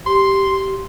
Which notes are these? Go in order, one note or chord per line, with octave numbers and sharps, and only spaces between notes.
G4 C6